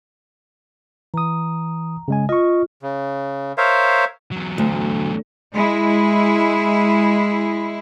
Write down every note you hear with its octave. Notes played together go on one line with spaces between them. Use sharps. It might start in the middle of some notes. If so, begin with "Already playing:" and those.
E3 A#5 D#6
C#3 G#3 G#5
F4 D#5 C#6
C#3
A#4 C5 C#5 E5 F5
E2 F#3
D2
G#3 E4